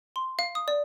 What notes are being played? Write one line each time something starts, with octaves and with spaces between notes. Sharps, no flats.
C6
F5
D#6
D5